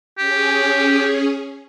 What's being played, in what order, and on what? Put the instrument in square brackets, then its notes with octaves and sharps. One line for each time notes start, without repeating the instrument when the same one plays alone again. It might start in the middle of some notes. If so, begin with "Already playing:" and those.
[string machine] C#4 G#4 [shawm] G4